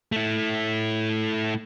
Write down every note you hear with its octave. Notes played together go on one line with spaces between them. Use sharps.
A3 E4